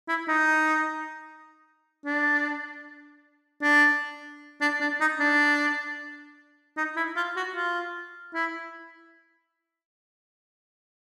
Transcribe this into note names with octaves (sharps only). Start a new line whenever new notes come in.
E4
D#4
D4
D4
D4
D4
D#4
D4
D#4
E4
F4
F#4
F4
E4